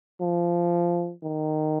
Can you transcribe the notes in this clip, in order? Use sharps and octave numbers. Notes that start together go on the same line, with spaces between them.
F3
D#3